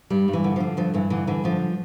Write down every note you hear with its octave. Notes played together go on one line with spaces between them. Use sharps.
G2 G3
G2
E3
D3
D3 F3
G2 F3
G2 E3
D3 E3
D3 E3
G2 F3